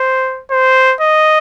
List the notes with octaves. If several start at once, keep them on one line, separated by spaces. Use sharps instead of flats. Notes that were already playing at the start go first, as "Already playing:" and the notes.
Already playing: C5
C5
D#5